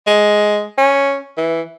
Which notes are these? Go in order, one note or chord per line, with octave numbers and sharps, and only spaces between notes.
G#3
C#4
E3